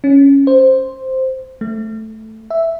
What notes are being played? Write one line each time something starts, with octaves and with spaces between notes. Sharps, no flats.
C#4
C5
A3
E5